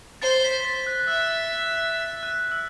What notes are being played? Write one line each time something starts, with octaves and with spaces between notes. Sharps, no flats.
C5 A6
B6
B6
A6
F#6
F#6
E5 E6
F#6
E6